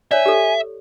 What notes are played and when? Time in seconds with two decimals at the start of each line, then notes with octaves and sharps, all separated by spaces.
0.11 C#5 D5 E5 G#5
0.26 G4 A4